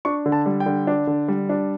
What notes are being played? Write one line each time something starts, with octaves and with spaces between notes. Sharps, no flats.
D4 C#6
D3
A5
G3
G5
D3
D4
D3
G3
D4